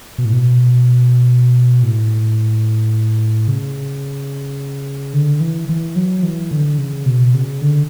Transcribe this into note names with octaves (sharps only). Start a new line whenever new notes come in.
B2
A2
B2
A2
C#3
D3
E3
E3
F#3
E3
D3
C#3
B2
C#3
D3